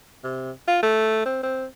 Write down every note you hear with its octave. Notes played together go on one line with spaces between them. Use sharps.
C3
F4
A3
C4
C4